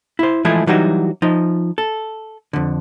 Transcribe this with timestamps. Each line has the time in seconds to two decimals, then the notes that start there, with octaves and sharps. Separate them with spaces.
0.19 E4 C5
0.45 E3 F3 G#3 A3 E4 G#4
0.67 E3 F#3 G3 D#4 F#4
1.22 F3 D#4
1.78 A4
2.53 F2 D3